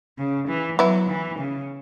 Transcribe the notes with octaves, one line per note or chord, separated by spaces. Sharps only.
C#3
E3
F#3 B3 E4
E3
C#3